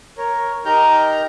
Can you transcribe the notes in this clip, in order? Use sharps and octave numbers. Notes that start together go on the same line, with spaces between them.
A#4 C#5
D#4 G4 A#4 A#5 F6 G6